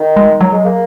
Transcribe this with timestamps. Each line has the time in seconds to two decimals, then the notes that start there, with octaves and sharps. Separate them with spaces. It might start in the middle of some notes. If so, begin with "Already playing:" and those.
Already playing: D#3
0.16 G#3
0.41 F#3
0.52 G#3
0.64 A#3